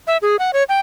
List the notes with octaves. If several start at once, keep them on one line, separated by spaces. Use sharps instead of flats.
E5
G#4
F#5
C#5
G5